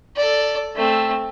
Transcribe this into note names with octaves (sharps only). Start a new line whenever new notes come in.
A4 D5
A3 C4